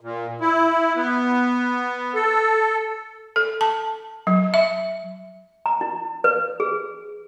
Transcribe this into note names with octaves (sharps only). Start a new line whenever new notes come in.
A#2
E4
B3
A4
A4
A5
F#3
E5
A#5
E4
B4
G#4